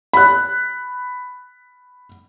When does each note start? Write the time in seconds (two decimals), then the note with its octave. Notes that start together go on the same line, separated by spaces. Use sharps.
0.13 B5 F#6